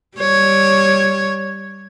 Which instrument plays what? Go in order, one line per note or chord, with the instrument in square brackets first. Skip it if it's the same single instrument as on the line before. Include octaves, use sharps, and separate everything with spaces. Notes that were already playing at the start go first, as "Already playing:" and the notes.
[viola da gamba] G3 C#5